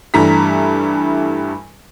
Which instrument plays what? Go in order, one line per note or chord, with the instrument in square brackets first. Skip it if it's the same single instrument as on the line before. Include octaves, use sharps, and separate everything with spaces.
[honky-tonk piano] G2 E3 G3 A3 A#5 B6